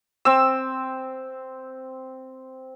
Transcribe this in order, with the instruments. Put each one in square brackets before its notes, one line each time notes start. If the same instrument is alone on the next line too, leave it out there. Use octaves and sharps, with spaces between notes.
[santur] C4 E6